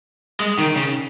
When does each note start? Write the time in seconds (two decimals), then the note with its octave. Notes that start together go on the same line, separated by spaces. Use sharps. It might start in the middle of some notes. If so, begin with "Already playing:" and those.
0.40 G#3
0.59 D#3
0.76 C#3